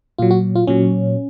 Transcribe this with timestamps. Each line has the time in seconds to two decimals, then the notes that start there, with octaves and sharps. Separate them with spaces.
0.18 A#2 F#3 F4
0.31 F#4
0.55 F4
0.67 A#2 F#3 C#4